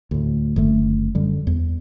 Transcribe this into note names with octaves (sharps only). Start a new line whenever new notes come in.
D2 A2
F#1 D3 A3
F#2 D3 G3
E2